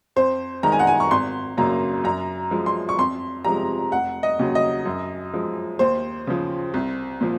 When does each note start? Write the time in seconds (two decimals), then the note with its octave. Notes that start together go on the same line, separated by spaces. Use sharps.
0.16 F2 C5
0.63 D#3 G#3 A#5
0.72 G#5
0.79 F#5
0.87 G#5
1.00 C#6
1.11 G#1 C6
1.57 F#2 C#3 F#3 A#3 A#5
2.04 F#2 A#5
2.51 F3 G#3
2.66 C6
2.89 C#6
2.98 F2 C6
3.45 C3 F3 G#3 A#5
3.92 F1 F#5
4.23 D#5
4.39 D#2 C#3 F#3
4.55 D#5
4.85 F#2
5.33 F3 G#3
5.79 D#2 C5
6.27 C#3 F3
6.74 C2
7.21 A#2 F3